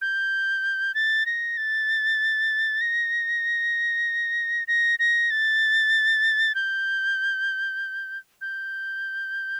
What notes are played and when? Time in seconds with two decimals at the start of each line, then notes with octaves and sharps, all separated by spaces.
0.01 G6
0.95 A6
1.26 A#6
1.57 A6
2.81 A#6
4.68 A#6
4.99 A#6
5.31 A6
6.55 G6
8.41 G6